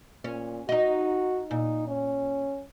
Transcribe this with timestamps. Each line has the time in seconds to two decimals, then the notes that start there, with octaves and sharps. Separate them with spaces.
0.24 A#2 C#4
0.69 D#4 F#4 D#5
1.51 A#2 D#4
1.88 C#4